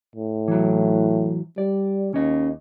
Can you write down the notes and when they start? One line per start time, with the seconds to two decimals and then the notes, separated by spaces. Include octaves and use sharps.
0.15 A2
0.48 E3 F#3
1.58 G3 D5
2.14 D#2 C#4 D#5